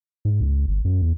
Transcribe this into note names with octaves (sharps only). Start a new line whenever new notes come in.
G#2
C#2
G1
F#2
E2